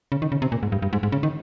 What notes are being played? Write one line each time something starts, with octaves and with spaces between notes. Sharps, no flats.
C#3
D#3
C#3
C3
A#2
G#2
G2
G2
G#2
G#2
C#3
D#3